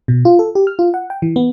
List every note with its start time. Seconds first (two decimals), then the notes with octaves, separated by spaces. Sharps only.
0.08 B2
0.25 F4
0.39 A4
0.55 G4
0.67 F6
0.79 F4
0.94 F#5
1.10 G5
1.22 E3
1.36 B3